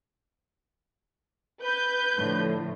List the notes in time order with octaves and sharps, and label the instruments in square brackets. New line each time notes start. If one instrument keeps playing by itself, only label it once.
[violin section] B4 G6
[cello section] A2 D3 F3